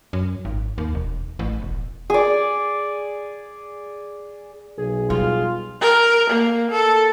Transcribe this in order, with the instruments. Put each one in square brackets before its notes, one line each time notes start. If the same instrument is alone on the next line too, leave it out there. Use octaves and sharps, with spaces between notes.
[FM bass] F#2
G#1
D#2
E1
A1
E1
[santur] G#4 D5
[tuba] B1 [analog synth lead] G#4
[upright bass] G3 [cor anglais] F4
[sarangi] A#4
A#3
A4